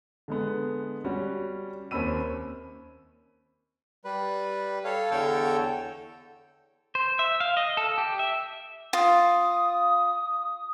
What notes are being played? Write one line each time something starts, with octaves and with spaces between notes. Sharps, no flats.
D3 G#3 B3
G3 C#4 F#4
D#2 C4 C#4 B5 E6 D#7
G3 B4
A4 C#5 F5
E2 D3 A4 C#5 G5 E6
C5
E5
F5
D#5
A4
G4
E5
F4 D#6